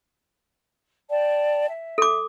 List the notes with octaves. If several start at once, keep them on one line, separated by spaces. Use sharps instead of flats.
D5 G5 A5
E5
A4 D6